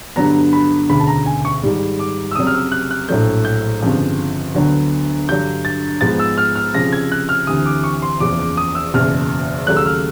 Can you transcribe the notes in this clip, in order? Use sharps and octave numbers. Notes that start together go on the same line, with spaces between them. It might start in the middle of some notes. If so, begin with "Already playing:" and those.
G2 D3 F#3 B3 A#5
B5
E1 D2 C#3 B5
A5
A#5
G#5
C#6
G#2 D#3 G3
D6
E6
F1 F2 C#3 F#3 D#6
F6
E6
F#6
F#6
A#1 A2 F#3 A3 G6
G6
G1 F2 C#3 F3
D2 D3 F#3 B3
G2 D3 F#3 G6
A6
G#2 F3 G#3 B3 A6
E6
F6
F6
F1 F2 C#3 F3 A#6
G#6
F#6
F6
D2 C3 E3 D#6
D6
C#6
C6
F#1 E2 C#3 F3 D6
D6
D#6
E6
F#1 E2 B2 F6
D#2 C#3 F#3 A3 F#6
E6
F6